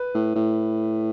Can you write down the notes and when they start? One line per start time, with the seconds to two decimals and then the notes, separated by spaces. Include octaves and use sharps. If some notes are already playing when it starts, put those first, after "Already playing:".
Already playing: B4
0.15 A2
0.35 A2